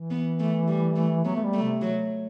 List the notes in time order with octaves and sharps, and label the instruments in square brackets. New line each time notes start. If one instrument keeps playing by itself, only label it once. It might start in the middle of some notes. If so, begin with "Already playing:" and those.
Already playing: [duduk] E3
[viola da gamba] B3
A3
G3
A3
[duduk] F#3 [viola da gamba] B3
[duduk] A3
G3
[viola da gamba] A3
[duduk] C3
[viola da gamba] F#3